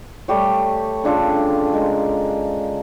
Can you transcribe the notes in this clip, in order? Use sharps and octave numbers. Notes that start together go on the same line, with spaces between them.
G3 A3 G4 C#5
C#3 D4 F4 A4
G#3 A#4